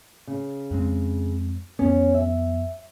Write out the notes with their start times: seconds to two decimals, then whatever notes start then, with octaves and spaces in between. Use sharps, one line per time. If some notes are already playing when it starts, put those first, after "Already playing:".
0.27 C#3
0.71 F2 G#3 C4
1.79 F2 B3 C#4
2.14 E5